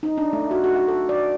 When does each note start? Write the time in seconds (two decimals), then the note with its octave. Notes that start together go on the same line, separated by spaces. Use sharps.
0.03 D#4
0.18 D4
0.33 A3
0.51 F#4
0.64 F#4
0.76 F#4
0.88 A4
1.09 D5